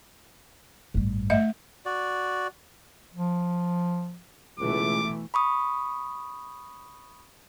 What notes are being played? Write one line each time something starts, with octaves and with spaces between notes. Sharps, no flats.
A1 G2
A3 D#5 E5
F#4 D5
F3
C#2 B2 E3 A3 D6
B5 C#6 D#6